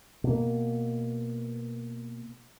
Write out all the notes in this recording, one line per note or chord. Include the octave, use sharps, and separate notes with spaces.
B2 A#3